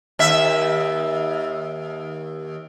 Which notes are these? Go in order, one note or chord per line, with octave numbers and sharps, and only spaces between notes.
D#2 E5